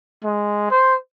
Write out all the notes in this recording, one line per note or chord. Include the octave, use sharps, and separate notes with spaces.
G#3
C5